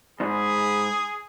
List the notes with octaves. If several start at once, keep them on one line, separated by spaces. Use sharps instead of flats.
E2 G#2 G#4 B5